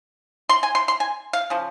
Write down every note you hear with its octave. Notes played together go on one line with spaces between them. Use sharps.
C6
G#5
C6
C6
G#5
F5
C#3 F3